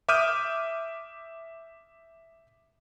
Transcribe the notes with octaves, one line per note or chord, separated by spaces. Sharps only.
E5 D6 D#6 F6 G6 D#7